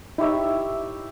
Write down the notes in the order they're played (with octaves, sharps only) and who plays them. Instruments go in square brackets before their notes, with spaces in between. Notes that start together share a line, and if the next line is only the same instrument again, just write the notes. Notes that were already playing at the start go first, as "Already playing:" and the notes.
[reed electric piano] D#4 [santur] E4 G4 C#5 E5